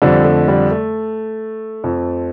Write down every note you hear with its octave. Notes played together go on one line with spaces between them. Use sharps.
F2 D3 F3 G3
A3
G3
A3
F2 F3